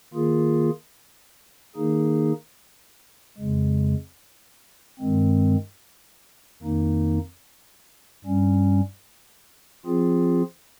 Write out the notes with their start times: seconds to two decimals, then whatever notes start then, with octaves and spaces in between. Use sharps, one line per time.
0.14 D#3 A#3 F4 G#4
1.75 D#3 A#3 D#4 G#4
3.38 F2 C#3 G#3
4.99 G2 D#3 G#3 C4
6.62 F2 D#3 A#3 D#4
8.24 G2 G3 C#4
9.86 F3 C4 F4 G#4